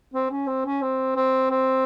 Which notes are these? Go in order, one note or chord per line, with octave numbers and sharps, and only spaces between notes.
C4
C#4
C4
C#4
C4
C4
C4